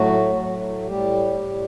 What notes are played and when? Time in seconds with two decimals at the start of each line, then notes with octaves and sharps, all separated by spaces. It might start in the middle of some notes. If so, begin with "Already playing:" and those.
Already playing: A2 F#3 A3 F#4
0.35 A2 F#3 A3
0.86 A2 G3 G4
1.39 A2 G3